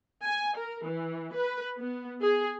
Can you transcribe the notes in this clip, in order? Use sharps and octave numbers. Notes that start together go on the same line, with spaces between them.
G#5
A#4
E3
B4
B3
G#4